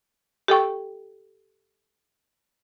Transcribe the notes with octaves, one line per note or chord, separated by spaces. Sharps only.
G4 A4 G5 C#6